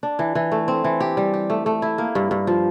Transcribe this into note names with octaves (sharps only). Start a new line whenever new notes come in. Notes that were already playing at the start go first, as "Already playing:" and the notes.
D4
E3
E3
A3
C4
E3
G4
G3
G4
A3
A3
E4
A#3
G2
G2
F3